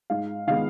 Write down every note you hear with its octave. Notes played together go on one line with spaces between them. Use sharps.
G#2 F5
D#3 G#3 B3 F5